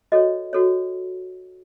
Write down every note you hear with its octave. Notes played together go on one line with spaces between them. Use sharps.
F#4 A4 C#5 D#5
F#4 A4 C#5